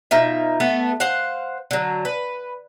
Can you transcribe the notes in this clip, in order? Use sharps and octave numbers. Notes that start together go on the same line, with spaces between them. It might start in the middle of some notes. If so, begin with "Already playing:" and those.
B2 D#4 F4 E5
A3 B3 A4
C5 F5 F#5
D3 F#3
B4